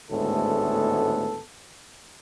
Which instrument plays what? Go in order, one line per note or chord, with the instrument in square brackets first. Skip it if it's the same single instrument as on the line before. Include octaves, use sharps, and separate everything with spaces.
[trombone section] G#1 D2 A2 G#3 B3 A4